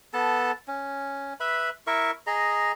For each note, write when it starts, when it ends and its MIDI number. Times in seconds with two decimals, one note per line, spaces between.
0.13 0.52 59
0.13 0.52 69
0.13 0.52 81
0.68 1.34 61
1.40 1.70 71
1.40 1.70 76
1.40 1.70 83
1.87 2.11 64
1.87 2.11 70
1.87 2.11 76
1.87 2.11 85
2.27 2.72 68
2.27 2.72 75
2.27 2.72 82